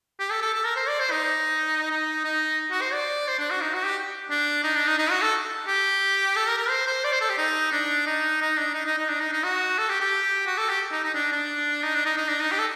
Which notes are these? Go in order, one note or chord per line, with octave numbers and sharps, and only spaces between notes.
G4
A4
A4
A4
A#4
C5
D5
C5
D#4
D#4
D#4
F#4
C5
D5
C5
D4
F#4
D#4
F#4
G4
D4
D#4
D4
D#4
D#4
F#4
A4
G4
A4
A#4
A#4
C5
C5
D5
C5
A4
G4
D#4
D4
D#4
D#4
D4
D#4
D#4
D#4
D4
D#4
D#4
F#4
A4
G4
G4
F#4
A4
G4
D#4
D#4
D4
D4
D#4
D4
D#4
D#4
D4
D#4
G4
A4